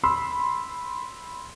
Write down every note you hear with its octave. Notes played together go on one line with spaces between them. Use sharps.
B5 C6 E6